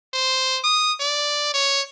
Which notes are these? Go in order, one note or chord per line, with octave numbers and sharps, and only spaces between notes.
C5
D#6
D5
C#5